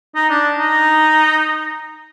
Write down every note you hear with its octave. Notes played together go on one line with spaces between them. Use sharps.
D#4
D4
D#4